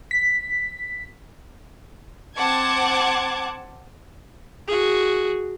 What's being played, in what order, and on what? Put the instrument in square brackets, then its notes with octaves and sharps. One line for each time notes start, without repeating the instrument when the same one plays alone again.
[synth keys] B6
[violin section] C4 F#5 A5 D6 G#6
[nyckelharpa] F#4 G#4